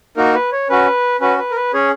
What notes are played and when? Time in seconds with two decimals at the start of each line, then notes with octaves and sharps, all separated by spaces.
0.17 A#3 D#4 F#4 A#4
0.35 B4
0.52 C#5
0.70 C#4 F#4 B4
1.21 C#4 F#4 B4
1.38 B4
1.51 A#4
1.56 B4
1.74 C#4 G#4 C#5